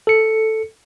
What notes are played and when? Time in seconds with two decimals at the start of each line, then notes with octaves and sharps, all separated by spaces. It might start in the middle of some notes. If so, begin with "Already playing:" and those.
0.07 A4 C#7